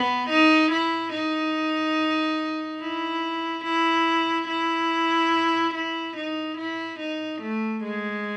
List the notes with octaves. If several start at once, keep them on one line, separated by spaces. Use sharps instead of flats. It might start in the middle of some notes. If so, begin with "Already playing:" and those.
Already playing: B3
D#4
E4
D#4
E4
E4
E4
E4
D#4
E4
D#4
A3
G#3